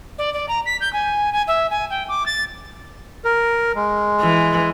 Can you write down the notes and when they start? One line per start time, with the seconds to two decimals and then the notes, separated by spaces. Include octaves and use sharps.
0.18 D5
0.33 D5
0.48 A#5
0.65 B6
0.80 G6
0.93 G#5
1.33 G#5
1.47 E5
1.70 G#5
1.90 G5
2.09 D6
2.26 A6
3.25 A#4
3.75 G#3
4.21 E3